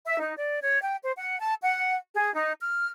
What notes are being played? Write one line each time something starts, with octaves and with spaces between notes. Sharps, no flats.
E5
D#4
D5
C#5
G5
C5
F#5
A5
F#5
G#4
D#4
F6